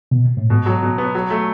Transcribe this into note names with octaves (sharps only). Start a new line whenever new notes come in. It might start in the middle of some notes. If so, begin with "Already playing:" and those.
B2
A#2
A2
G#2 B2
F#3
B2
B3
F#3
A3